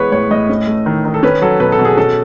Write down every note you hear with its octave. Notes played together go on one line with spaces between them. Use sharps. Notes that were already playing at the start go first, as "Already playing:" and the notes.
Already playing: E3 G#3 B3 B4 C#5
A2 C#5
A2 D#5
C#4
A3
D#3
D#3
A4
C#4 B4
F#3 A4
B2 B4
A4
B2
G#4
C#4 A4